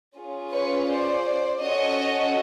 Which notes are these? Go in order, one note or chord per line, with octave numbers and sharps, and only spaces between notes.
C#4 F4 G#4
B4 C#5
C5 D5
C#4 F#4 A4 C#5 D#5